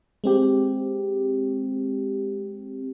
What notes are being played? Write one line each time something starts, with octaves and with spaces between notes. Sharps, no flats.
G#3 C4 G4